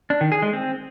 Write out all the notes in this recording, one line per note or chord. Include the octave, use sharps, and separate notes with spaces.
D4
D#3
G#4
G#3
C4